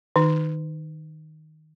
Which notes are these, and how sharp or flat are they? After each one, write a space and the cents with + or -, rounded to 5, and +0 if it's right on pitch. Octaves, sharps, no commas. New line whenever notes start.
D#3 +0 D#4 -10